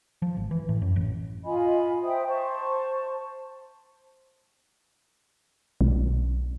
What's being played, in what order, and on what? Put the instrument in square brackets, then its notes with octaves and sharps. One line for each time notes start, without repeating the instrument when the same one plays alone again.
[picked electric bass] F3
G#1
E3
A2
F#2
A1
[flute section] F4 D#5 G#5 B5
C5 E5 G5 D#6
C5 A5 C#6
[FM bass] B1